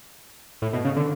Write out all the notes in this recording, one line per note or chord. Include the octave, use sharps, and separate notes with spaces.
A2
B2
C#3
D3